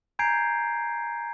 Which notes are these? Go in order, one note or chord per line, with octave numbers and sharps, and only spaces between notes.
G#5 A#5 G6 G#6 C7 D7